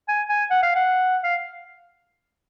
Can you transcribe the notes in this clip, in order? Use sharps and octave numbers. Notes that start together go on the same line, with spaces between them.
G#5
G#5
F#5
F5
F#5
F5